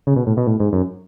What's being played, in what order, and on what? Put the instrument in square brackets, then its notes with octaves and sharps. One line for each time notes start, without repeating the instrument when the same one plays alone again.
[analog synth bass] C#3
B2
A2
B2
A2
G#2
F#2